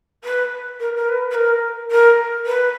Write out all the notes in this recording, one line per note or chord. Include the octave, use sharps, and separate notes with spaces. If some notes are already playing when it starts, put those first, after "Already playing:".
B4
A#4
A#4
B4
B4
A#4
A#4
B4